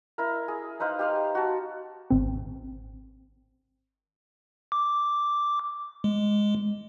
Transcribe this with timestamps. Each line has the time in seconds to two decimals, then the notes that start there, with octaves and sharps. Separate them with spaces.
0.18 E4 A#4
0.48 G#4
0.80 D#4 B4 C5 F5
0.99 G4 F5 C6
1.35 F#4 A5
2.10 G#1 C4
4.72 D6
6.04 G#3